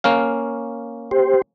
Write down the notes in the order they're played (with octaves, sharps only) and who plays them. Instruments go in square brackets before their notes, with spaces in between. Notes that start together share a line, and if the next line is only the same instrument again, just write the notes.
[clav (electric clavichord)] A#3 C#4 F5
[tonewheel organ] G4 C5